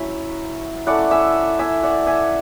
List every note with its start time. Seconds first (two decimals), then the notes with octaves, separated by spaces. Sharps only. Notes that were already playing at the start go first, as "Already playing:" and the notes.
Already playing: F#3 C#4 E4 E5
0.86 A3 C#4 E4 D5 F#5
1.11 E5 G#5
1.59 E5 G#5
1.83 D5 F#5
2.07 E5 G#5